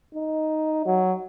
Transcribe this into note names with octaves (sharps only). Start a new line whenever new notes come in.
D#4
F#3